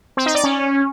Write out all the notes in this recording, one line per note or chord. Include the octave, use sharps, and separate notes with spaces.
C4
D#4
D5
C#4